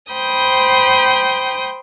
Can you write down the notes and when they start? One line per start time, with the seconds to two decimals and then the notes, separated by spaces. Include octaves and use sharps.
0.12 C5 G5 B5 D#6 G6